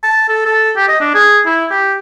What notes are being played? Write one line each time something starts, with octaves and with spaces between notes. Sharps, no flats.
A5
A4
A4
G4
D#5
D4
G#4
E4
G4